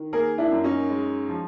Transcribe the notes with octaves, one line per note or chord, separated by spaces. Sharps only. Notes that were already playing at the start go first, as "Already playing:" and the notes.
Already playing: D#3
A#3 G#4 A#4
D4 E4
F#2
C#4 D#4
G#3
F3